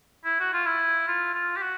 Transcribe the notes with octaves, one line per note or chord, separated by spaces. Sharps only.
E4
F#4
F4
E4
F4
F4
G4
F#4